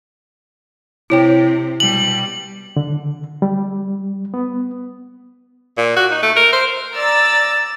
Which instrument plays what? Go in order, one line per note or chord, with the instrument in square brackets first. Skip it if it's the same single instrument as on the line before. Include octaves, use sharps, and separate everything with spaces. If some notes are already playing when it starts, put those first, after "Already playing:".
[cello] C3 [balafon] E4 C#5 G5
[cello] B2 G3 [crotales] F#7
[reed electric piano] D3
G3
B3
[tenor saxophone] A#2
F#4
D#4
A3
A#4
C5
[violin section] D5 A#5 E6 A6